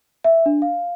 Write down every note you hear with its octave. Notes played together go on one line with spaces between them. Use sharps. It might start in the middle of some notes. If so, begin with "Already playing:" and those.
E5
D4
F5